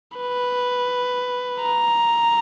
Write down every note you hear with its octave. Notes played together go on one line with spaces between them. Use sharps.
B4
A#5